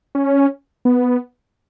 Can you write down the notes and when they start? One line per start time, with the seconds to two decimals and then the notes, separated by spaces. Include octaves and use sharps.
0.15 C#4
0.85 B3